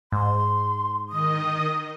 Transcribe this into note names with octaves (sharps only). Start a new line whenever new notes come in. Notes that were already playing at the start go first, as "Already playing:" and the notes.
G#2 C6
D#3 D#5 D#6